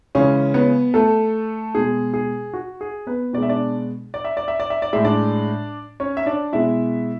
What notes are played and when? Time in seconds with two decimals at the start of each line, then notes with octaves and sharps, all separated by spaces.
0.15 C#3 E3 G#3 C#4 C#5
0.54 B3 B4
0.94 A3 A4
1.75 B2 G#3 G#4
2.14 G#4
2.53 F#4
2.81 G#4
3.07 B3 B4
3.33 B2 D5
3.38 G#3 E5
3.49 D4 D5
4.14 D5
4.25 E5
4.37 D5
4.48 E5
4.60 D5
4.70 E5
4.82 D5
4.93 A2 G#3 E5
5.04 D4 D5
6.00 C#4 C#5
6.17 E5
6.26 D4 D5
6.53 B2 G#3 E4 E5